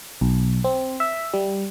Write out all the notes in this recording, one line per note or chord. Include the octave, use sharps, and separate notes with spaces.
B1
C4
E5
G3